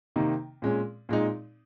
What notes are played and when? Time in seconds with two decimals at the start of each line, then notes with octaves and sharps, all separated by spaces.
0.16 C3 D#3 A#3 D#4
0.62 A#2 G#3 C#4
1.09 A#2 G#3 D#4